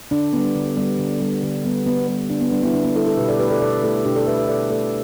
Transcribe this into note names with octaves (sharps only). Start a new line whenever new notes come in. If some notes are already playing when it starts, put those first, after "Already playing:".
D3 D4
G3 B3
D3
G3 B3
D3
G3 B3
D3
G3 B3
D3 B3
G3 B3
D3 D4
B3
G3 B3 D4
B3 E4
D3 D4
B3
G3 B3 E4 A4
E4 A4
B2 G4 B4
A4 D5
A3 G4 B4
A4 D5
B2 A4 D5
A3 E4 A4
B2 D4 G4
A4 D5
A3 B4 E5
B4 E5
B2 A4 D5
A3 A4 D5